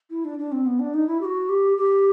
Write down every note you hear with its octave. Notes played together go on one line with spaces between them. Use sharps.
E4
D4
D4
C4
B3
D4
D#4
E4
G4
F#4
G4
G4